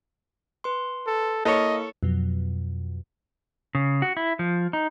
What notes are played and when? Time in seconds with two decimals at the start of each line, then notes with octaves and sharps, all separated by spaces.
0.64 B4 C6
1.07 A4
1.45 A#3 E4 A4 A#4 C#5 D#5
2.03 F2 B2 F#3
3.75 C#3
4.02 F#4
4.17 E4
4.39 F3
4.73 D#4